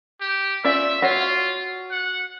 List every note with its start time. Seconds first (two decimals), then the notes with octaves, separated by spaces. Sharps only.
0.21 G4
0.64 C#4 F4 D5 E5
1.02 F4 F#4 C#5
1.91 F#5